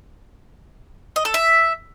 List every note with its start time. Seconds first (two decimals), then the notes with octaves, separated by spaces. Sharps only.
1.16 D#5
1.25 A4
1.34 E5